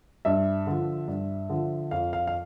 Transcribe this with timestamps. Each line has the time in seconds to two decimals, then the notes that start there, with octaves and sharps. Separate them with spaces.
0.25 G2 E5
0.67 D3 F3
1.08 G2
1.50 D3 F3
1.91 F2 F5
2.13 F5
2.27 F5